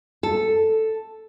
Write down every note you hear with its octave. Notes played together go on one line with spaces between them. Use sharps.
A4